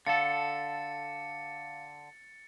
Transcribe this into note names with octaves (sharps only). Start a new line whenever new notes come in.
D3 A4 F5 A6 C#7